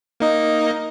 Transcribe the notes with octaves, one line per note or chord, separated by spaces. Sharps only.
A#3 D#4 D#5